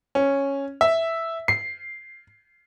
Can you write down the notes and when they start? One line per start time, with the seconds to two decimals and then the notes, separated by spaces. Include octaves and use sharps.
0.15 C#4
0.81 E5
1.48 C7